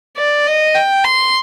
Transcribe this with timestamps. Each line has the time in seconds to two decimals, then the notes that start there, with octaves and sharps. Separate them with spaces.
0.17 D5
0.47 D#5
0.75 G5
1.04 C6